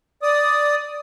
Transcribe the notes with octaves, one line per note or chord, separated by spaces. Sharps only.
D5 D#6